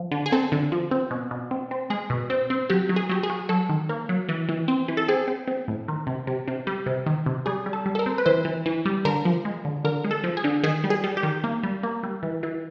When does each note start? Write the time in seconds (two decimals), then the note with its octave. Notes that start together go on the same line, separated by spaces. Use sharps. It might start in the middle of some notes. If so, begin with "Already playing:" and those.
Already playing: F3
0.11 D3
0.26 G#4
0.32 C4 A4
0.52 D3
0.72 F3
0.91 C4
1.11 B2
1.31 B2
1.51 C4
1.71 C4
1.90 G#3 G#4
2.10 B2
2.30 C4
2.50 C4
2.70 F#3 G4
2.89 F#3
2.96 G#4
3.09 F#3 G4
3.23 G#4
3.30 F#3
3.49 F#3 A4
3.69 D#3
3.89 A#3
4.09 F#3
4.29 E3
4.49 E3
4.68 C4
4.88 E3
4.97 A4
5.08 C4 G#4
5.28 C4
5.48 C4
5.68 A2
5.88 D#3
6.07 C3
6.27 C3
6.48 C3
6.67 G3
6.86 C3
7.06 D#3
7.26 C3
7.46 G3 G#4
7.66 G3
7.73 A4
7.86 G3
7.95 A4
7.99 A#4
8.06 C4
8.18 B4
8.26 E3 C5
8.45 E3
8.66 E3
8.85 G3
9.05 D3 A#4
9.25 F3
9.45 G#3
9.65 D3
9.85 D3 A#4
10.05 G#3
10.11 A4
10.24 F3
10.37 G#4
10.44 D3
10.63 D#3 G#4
10.84 G3
10.90 G#4
11.04 G3
11.17 G4
11.23 D#3
11.44 A#3
11.63 G3
11.83 A#3
12.03 G3
12.23 E3
12.43 E3